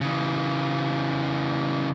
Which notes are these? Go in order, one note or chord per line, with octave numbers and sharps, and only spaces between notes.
C#3 E3